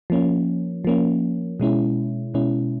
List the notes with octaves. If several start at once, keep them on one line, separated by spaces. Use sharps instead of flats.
F3 A#3 C#4
F3 A#3 C#4
B2 G#3 C#4 E4
B2 G#3 C#4 E4